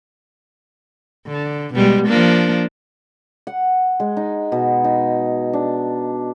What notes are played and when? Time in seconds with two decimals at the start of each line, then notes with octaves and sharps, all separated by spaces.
1.27 D3
1.74 B2 G3 G#3
2.07 F3 A#3 D4
3.47 F#5
4.00 G#3
4.17 D#4
4.52 B2
4.84 D#4
5.53 D4